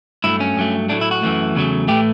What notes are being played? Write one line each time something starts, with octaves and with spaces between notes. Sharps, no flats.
G2 F#3 A3 E4
C#4
G2 F#3 A3
A2 F#3 A3 D4
E4
F#4
F#2 E3 A3
E2 C#3 F#3 A3
A2 E3 A3 G4